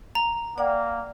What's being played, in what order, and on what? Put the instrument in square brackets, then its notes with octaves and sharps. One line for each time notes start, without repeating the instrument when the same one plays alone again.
[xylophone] A#5
[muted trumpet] A#3 [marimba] D5 F#5 G5